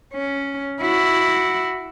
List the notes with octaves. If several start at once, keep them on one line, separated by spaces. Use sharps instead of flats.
C#4
E4 F#4